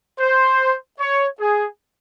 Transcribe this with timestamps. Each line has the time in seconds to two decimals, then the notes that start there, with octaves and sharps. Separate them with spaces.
0.19 C5
0.99 C#5
1.39 G#4